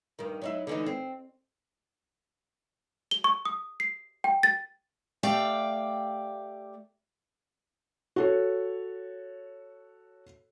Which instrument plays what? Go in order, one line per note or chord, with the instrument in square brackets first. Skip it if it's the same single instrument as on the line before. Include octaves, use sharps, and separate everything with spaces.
[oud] G2 D#3
F#3 D#4 E4
D3 E3 D#4
C4
[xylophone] G7
C#6
D#6
C7
G5
A6
[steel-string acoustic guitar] A3 G4 D5 F5 G5
[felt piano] F#4 A4 C#5